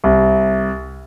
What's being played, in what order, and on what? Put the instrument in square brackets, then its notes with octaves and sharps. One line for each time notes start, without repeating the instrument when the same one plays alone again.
[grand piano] C2